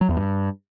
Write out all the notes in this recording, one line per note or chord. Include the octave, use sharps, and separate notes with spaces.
F#3
E2
G2